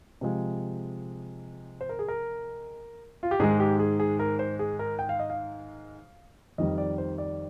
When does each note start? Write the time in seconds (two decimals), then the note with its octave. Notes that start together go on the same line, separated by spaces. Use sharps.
0.21 C3 F3 G#3
1.81 C5
1.89 A#4
1.99 G#4
2.08 A#4
3.23 F4
3.31 G4
3.40 G#2 D#3 G#3 G#4
3.60 G4
3.80 G#4
4.00 G#4
4.19 A#4
4.39 C5
4.59 G#4
4.79 A#4
4.99 G5
5.09 F5
5.20 D#5
5.30 F5
6.58 F2 D#3 G3 D#5
6.78 D5
6.98 C5
7.18 D5